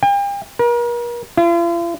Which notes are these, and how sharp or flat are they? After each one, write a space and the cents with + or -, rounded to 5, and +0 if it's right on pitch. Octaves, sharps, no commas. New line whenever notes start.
G5 +40
A#4 +40
F4 -45